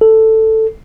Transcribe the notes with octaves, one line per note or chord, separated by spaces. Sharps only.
A4